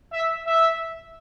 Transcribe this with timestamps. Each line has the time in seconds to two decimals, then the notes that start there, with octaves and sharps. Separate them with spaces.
0.12 E5
0.46 E5